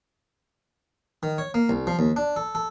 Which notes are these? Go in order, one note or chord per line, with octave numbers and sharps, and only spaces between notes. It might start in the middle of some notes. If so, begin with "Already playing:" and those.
D#3
C#5
A#3
C2
F3
D#2
D4
A4
A4